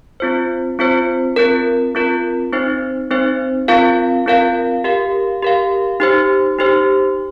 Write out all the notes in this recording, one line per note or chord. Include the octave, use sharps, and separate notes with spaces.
C4 F4 C5
C4 F4 C5
C4 F4 A#4
C4 F4 A#4
C4 D#4 C5
C4 D#4 C5
C4 F4 A#4 F5
C4 F4 A#4 F5
G4 A#4 F5
G4 A#4 F5
D#4 G4 C5
D#4 G4 C5